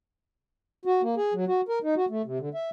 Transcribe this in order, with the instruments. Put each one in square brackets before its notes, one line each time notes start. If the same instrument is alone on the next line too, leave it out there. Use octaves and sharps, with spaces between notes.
[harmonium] F#4
A#3
G#4
F#3
F#4
A#4
D#4
F#4
A3
C3
D3
E5